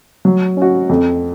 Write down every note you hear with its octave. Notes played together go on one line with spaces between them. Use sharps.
F#3
C#4 F#4
F2